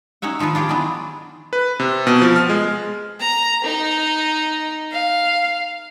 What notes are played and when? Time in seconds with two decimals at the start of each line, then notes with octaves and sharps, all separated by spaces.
0.22 C#4 D#4 C#5 E5 F#5
0.39 D#3 F3 D#4 F4 B4
0.55 D4 F4 G4 G#4
0.69 D#3 E3 F#3 G#3 B3 D4
1.53 B4
1.80 C3
2.07 B2
2.22 F3
2.36 F6
2.50 G#3
3.20 A#5
3.64 D#4
4.92 F5